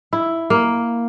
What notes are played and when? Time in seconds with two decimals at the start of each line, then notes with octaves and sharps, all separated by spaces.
0.13 E4
0.50 A#3